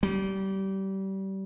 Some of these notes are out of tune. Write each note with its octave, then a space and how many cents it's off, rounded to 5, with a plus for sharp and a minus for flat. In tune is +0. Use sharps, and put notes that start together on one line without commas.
G3 -25